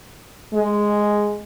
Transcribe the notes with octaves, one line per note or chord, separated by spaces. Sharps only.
G#3